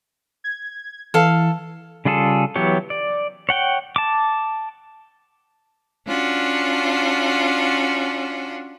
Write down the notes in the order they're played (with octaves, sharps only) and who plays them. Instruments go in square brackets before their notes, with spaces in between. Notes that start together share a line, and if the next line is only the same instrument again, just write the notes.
[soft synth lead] G#6
[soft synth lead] E3 [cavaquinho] A4 F5
[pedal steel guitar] C#3 G3 F4 G#4 A4
E3 F#3 B3 G4 C#5
D5
C#5 F#5 G5
A5 D6
[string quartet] C#4 D4 F4 F#4